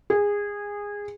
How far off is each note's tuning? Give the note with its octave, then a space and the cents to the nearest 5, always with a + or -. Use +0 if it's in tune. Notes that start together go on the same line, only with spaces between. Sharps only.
G#4 -20